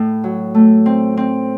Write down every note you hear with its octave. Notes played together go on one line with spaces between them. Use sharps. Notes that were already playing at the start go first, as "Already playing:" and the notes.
Already playing: A2
F#3
A3
C4
C4